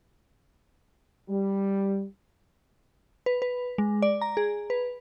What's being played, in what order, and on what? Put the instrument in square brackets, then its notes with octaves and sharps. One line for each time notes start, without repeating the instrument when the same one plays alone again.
[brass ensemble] G3
[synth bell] B4
B4
G#3
D5
A#5
G#4
B4